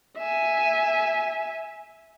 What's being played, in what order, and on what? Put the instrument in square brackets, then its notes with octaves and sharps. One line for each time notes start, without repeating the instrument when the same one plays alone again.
[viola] E5 G#5